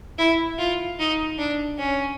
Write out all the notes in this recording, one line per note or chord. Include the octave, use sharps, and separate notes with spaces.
E4
F4
D#4
D4
C#4